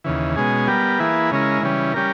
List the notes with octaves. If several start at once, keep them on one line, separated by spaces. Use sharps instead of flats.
D#2 C#3 E3
B2 G#3 C#4 G#4
G3 B3 G4 A#4
E3 A#3 E4 G#4 B4
C#3 G#3 C#4 E4 A#4
C#3 E3 G3 C#4
G3 C#4 G4 A#4